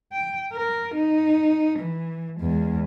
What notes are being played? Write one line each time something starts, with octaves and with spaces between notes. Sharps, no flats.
G5
A#4
D#4
E3
E2 G#3